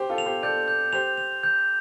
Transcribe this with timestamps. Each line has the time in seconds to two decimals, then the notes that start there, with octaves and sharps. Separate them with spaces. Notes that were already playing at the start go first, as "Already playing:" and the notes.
Already playing: G4 C5
0.10 F4 A4
0.18 F7
0.26 G4 C5
0.43 A4 D5 G6
0.68 G6
0.93 G4 C5 F7
1.17 F7
1.43 G6